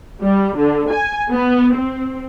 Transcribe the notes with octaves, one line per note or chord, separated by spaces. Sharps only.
G3
D3
G#5
B3
C4